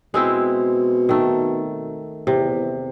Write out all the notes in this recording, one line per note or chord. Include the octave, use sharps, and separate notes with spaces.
B2 G#3 C4 E4
D#3 A3
E2 C3